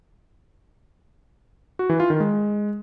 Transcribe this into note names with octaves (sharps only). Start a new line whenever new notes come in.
F#4
E3
F4
D#3
G#3